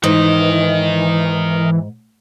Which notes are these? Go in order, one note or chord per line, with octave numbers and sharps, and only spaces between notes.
G#2 E3 A#4 D#5